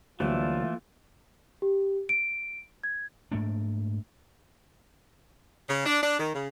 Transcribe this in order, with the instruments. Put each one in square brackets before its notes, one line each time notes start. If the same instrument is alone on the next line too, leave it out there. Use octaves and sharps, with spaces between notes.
[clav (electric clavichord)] D2 F#3 G3 [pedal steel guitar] E3 A3 [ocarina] A#3 [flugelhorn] F4
[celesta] G4
D7
G#6
[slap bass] G#2 A3 A#3 D4
[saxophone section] C#3
D4
D4
D#3
C#3